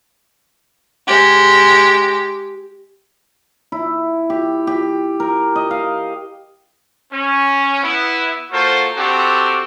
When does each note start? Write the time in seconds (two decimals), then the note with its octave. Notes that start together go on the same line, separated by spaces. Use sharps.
1.07 G#3 G4
3.72 E4
4.30 G4
4.67 G4
5.20 A#4
5.56 D#5
5.71 F5
7.13 C#4
7.83 B3 E4
8.52 A#3 F4 F#4 A4 C5
8.97 C4 D4 F#4 G4 A4